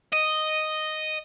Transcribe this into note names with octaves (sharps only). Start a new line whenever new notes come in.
D#5